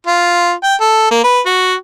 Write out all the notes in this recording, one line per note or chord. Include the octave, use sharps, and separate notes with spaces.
F4
G5
A4
A#3
B4
F#4